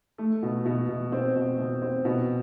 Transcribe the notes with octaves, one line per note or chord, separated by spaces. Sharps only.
A3
B2
B2
B2
C4
B2
B2
C4
B2